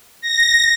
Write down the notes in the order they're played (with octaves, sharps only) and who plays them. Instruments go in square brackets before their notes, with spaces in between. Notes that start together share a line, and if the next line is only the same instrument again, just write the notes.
[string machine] A#6